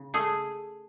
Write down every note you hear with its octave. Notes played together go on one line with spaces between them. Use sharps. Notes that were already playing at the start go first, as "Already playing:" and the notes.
Already playing: C#3
A3 G#4